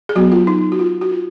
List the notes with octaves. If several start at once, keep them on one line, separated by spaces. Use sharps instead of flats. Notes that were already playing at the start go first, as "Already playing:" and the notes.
G#4
F#3 B3 F#4
F4
D#4
F#4
F4
F#4
F4